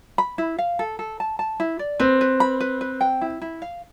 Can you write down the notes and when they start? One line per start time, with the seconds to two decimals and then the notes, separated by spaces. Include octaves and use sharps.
0.18 B5
0.38 E4
0.58 F5
0.79 A4
0.99 A4
1.20 A5
1.39 A5
1.60 E4
1.79 D5
2.00 C4 B4
2.21 B4
2.40 B5
2.60 B4
2.81 B4
3.01 G5
3.21 E4
3.42 E4
3.62 F5